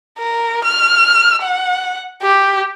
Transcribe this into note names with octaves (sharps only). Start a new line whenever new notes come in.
A#4
F6
F#5
G4